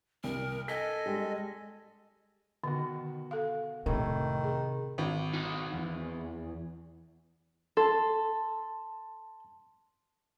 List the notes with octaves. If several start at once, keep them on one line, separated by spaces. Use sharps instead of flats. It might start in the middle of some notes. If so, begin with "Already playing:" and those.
C2 A#4
A4 D#5 G#5 B6
G3 G#3
B2 D3 D#3 F#4
A4 F5
F2 A2 C3 D#3
G#4
G#1
D#4 F#4
E2
A4 A5 C6